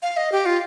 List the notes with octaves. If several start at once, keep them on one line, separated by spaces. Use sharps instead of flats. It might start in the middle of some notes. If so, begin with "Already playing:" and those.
F5
D#5
G4
F4